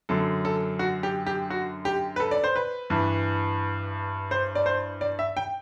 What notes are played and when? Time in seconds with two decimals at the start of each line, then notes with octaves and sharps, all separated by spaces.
0.09 F#2 D3 A4
0.45 A4
0.79 F#4
1.03 G4
1.27 G4
1.50 F#4
1.85 G4
2.16 B4
2.20 A4
2.31 D5
2.44 C5
2.56 B4
2.90 G2 E3
4.31 C5
4.55 D5
4.66 C5
5.01 D5
5.19 E5
5.37 G5